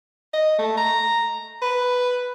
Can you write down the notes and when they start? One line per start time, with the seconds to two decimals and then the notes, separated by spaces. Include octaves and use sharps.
0.34 D#5
0.59 A3
0.77 A#5
1.62 B4